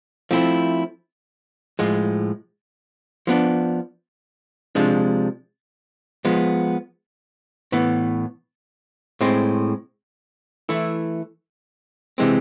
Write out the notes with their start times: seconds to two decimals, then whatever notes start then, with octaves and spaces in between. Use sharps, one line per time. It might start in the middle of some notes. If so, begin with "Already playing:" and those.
0.31 F3 A3 C4 E4
1.79 A2 F3 G#3
3.27 F3 B3 D4
4.75 C3 F3 G#3 D4
6.25 F3 G#3 B3
7.72 A2 E3 B3
9.21 A2 G#3 C4
10.69 E3 A3 E4
12.18 C3 E3 G#3 C4